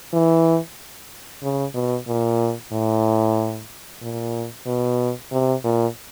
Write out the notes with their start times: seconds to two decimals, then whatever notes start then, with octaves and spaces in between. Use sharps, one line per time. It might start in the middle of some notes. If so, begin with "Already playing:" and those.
0.13 E3
1.43 C#3
1.74 B2
2.08 A#2
2.72 A2
4.02 A#2
4.66 B2
5.32 C3
5.64 A#2